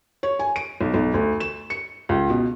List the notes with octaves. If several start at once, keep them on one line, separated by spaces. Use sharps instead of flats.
C#5
G#5
D7
B1
B1
D2
E7
C#7
C#2
B2